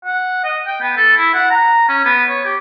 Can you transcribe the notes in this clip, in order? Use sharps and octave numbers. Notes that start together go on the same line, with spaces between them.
F#5
D#5
G5
B3
A4
E4
F#5
A#5
C#4
B3
C#5
G4